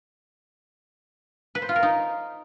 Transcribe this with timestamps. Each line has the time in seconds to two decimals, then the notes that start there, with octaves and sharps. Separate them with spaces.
1.55 B4
1.62 C5
1.69 F4
1.76 A#4
1.83 D#4